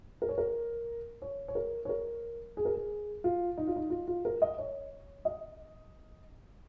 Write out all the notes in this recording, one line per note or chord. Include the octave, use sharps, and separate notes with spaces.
A#4
C#5
A#4
C#5
C#5
A#4
C#5
A#4
G#4
A#4
G#4
F4
D#4
F4
D#4
F4
F4
A#4
D#5
C#5
D#5